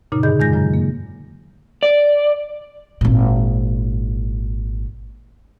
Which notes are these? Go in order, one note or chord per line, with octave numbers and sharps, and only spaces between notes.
F#2 A#2 C#3 D#4
G2 D3 G#4 D#5 G6
F2 D#3 G#3 G6 A#6
F#2 C#3 F#3 G#3
A#3
D5
G#1 A#2